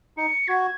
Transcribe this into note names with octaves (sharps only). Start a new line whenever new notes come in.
D#4 C#7
F#4 G#6